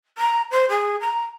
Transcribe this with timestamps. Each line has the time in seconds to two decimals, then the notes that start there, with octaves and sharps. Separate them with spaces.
0.18 A#5
0.51 C5
0.69 G#4
1.01 A#5